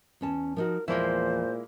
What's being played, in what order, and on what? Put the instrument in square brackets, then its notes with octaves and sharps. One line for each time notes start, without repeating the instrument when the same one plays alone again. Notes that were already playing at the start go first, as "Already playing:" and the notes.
[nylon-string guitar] E2 C#4 A5
[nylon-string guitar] F3 D#4 F#4 [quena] A#4
[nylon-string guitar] E2 F3 [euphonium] A#2 [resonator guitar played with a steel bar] G#3 A#3 E4 [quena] C5